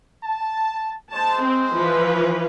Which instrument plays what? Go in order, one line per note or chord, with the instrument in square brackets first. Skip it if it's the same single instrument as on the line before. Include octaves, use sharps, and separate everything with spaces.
[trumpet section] A5
[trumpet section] G#3 C5 [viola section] A5
[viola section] C4
E3 F3 B4